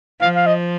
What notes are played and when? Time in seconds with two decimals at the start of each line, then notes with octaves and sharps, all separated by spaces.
0.21 F3 F5
0.35 F5
0.46 D#5